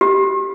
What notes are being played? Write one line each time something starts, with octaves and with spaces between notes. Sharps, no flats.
G4